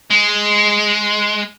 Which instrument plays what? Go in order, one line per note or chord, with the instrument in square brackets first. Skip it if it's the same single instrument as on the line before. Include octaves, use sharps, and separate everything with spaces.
[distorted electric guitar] G#3